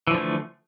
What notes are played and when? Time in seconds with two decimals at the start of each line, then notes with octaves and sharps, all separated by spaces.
0.07 E3
0.11 F3
0.14 D3
0.18 A3